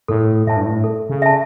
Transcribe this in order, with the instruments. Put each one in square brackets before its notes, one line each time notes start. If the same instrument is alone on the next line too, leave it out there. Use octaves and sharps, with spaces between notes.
[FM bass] A2 [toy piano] A4
[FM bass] A2 [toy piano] E5 A5
[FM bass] G2
A2
[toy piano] A4
[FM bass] C#3
[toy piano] E5 A5